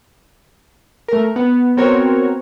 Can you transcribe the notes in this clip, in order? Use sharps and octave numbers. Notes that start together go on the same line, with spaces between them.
A3 A#4
B3
B3 C4 F#4 A#4 C#5